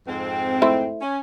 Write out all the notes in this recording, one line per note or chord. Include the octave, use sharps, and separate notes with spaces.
F2 G#2 C4
A3 E4 C5
C#4